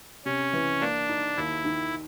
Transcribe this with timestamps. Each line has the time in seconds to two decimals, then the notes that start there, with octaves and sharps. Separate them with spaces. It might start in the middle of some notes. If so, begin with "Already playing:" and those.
0.25 C3 C#4
0.53 E3
0.81 A#3 D4
1.09 D#4
1.37 D#2 E4
1.65 D#3